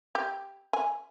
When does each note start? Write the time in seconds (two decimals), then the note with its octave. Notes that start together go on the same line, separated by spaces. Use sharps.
0.15 G4
0.73 G#5